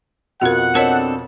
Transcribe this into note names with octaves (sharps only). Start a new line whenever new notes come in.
F2 B2 F4 F#4 A#4 F#5
C4 D4 A4 A#4 C#5 D#5